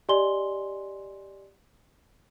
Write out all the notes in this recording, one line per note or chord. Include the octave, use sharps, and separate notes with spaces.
G4 D5 D#5 G#5 C6 G7